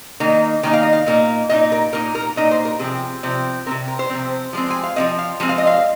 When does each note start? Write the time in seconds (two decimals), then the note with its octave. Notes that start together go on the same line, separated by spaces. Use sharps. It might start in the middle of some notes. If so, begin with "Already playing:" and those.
0.20 D#3 A#3 D#4
0.63 D#3 A#3 D#4 G#5
0.73 F5
0.83 D#5
0.93 F5
1.06 A#2 A#3 D#4
1.49 A#2 A#3 D#4 D#5
1.72 A#4
1.93 A#2 A#3 D#4 A#4
2.15 A#4
2.36 A#2 A#3 D#4 D#5
2.51 C5
2.65 A#4
2.79 C3 F3 C4 G#4
3.23 C3 F3 C4
3.66 F3 C4 A#4
3.71 C3
3.88 A#4
3.99 C5
4.10 C3 F3 C4
4.53 F3 G#3 C4
4.70 G#5
4.83 F5
4.96 F3 G#3 C4 D#5
5.18 F5
5.40 F3 G#3 C4
5.49 F5
5.58 D#5
5.67 F5